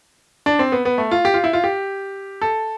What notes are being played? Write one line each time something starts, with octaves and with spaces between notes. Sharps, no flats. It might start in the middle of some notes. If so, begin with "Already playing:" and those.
D4
C4
B3
B3
A3
F4
G4
F4
E4
F4
G4
A4